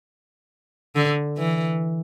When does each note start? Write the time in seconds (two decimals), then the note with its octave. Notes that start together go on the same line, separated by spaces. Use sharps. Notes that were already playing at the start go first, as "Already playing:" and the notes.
0.96 D3
1.37 E3